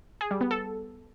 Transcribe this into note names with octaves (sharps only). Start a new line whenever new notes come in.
G#4
G3
B3
A4